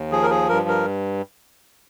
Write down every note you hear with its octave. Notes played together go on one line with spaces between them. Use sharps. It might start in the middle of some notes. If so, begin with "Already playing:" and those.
Already playing: D#2
F3 G#4
A#4
G#4
G2 A#4
A#4